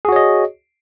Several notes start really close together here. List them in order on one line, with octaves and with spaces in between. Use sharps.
G#4 F#4 C#5 D#5